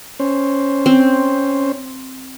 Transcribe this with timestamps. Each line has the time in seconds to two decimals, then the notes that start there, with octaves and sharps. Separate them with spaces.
0.20 C#4 C5
0.86 C4